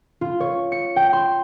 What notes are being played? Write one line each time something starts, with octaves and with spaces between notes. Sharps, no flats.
F4
C#5
C#7
G5
C6